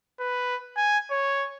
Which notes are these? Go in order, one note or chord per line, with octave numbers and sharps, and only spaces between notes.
B4
G#5
C#5